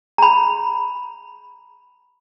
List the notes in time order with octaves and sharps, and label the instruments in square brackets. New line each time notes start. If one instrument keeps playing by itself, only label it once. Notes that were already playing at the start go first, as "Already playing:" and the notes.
[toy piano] A#5 B5